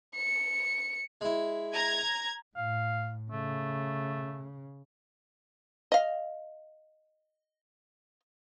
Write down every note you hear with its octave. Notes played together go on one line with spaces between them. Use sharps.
C#7
G#3 E4
A#5 G#6
A2 F5
C#3 A3
D#5 F5